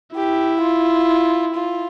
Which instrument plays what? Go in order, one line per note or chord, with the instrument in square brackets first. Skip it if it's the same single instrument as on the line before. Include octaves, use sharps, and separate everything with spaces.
[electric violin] E4 [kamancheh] G4
[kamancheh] F4
F4